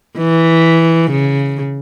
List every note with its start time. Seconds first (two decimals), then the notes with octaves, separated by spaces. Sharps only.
0.18 E3
1.11 C#3